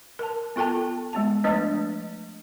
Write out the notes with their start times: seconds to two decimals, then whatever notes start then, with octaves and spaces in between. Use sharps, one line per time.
0.19 A#4 A5
0.56 B3 F4 A4 G5 A5
1.13 G#3 B3 A5
1.44 F3 A3 D4 B4 D#5